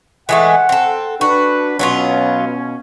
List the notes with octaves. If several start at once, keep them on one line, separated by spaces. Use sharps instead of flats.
E3 G#3 A3 F#5
C4 A4
D4 F#4 B4
B2 F#3 B3 C#4 F4